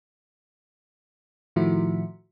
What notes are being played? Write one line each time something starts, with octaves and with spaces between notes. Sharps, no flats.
A2 D#3 F3 A3 E4 F#4